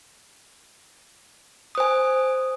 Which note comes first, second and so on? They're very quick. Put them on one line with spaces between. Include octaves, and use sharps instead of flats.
D#6 C5 G#5